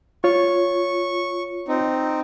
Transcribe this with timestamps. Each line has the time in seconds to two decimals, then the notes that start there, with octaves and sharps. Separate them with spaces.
0.24 F4 C#5 C#6
1.68 C4 D#4